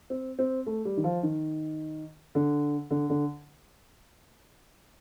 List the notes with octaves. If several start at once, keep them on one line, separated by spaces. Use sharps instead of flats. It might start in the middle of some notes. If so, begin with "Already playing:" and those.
C4
C4
A3
G3
D#3
F3
D#3
D3
D3
D3